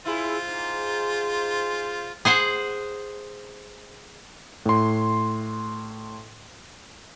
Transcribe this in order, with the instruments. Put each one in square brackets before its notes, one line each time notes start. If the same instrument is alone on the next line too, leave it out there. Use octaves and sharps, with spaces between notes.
[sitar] E4 G#4 [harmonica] F4 C5
[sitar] G#2
[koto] G#4 C5 F#5
[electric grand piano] A2 C6